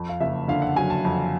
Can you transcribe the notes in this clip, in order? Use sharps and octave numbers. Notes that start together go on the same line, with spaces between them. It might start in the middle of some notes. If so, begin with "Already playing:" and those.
Already playing: F2
F5
F#1 E5
D3 F5
F#5
F#3 G#5
A5
F2